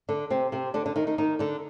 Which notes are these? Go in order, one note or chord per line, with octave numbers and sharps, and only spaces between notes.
D3 D4
C3 C4
C3 C4
D3 D4
D3 D4
D#3 D#4
D#3 D#4
D#3 D#4
D3 D4